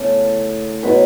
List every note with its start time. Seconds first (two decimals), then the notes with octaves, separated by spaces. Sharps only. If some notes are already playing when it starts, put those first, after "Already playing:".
Already playing: C#3 A3 B3 E4 A5
0.83 B2 F#3 B3 E4 B4